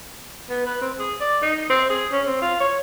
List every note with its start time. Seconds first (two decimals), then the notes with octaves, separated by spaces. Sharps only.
0.50 B3
0.67 B4
0.82 C4
0.99 G#4
1.21 D5
1.42 D#4
1.70 C4
1.90 G#4
2.12 C#4
2.26 C4
2.42 F4
2.60 C#5